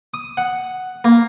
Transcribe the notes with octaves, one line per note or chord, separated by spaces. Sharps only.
D#6
F#5
A#3